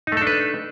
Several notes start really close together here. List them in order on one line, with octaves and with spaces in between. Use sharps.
D#4 A3 A4 D4 B4